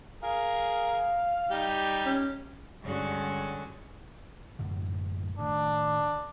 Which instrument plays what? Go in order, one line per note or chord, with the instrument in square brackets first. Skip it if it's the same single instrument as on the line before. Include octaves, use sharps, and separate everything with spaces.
[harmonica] G#4 A#4 [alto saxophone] F5
[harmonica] G3 D#4 G4
[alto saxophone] C#4
[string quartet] G2 D3 G#3 C#4 F#4
[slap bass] F#2 A2 D3
[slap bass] A2 D#3 A3 [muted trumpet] D4